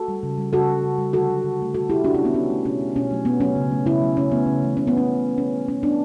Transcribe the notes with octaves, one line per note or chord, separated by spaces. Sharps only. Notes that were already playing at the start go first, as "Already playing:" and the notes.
Already playing: F#4 A4
G3
C#3
G3
C#3 F#4 A4
G3
C#3
G3
D3 F#4 A4
F#3 A3
D3
F#3 A3
B2 F#4 A4
A3 E4 G4
B2 D4 F#4
C#4 E4
A3
B3 D4
B2 C#4
A3
B2 C#4
A3
B2 C#4
F#3 A3
B2 B3
F#3 A3 C#4
C#3
F#3 A3
C#3 C#4 E4
F#3 A3
C#3 C#4
E3 A3 B3
C#3
E3 A3
C#3 C#4
B3
G3 C#4
C#3
G3
B2 C#4
G3
B2 C#4
G3 B3 D4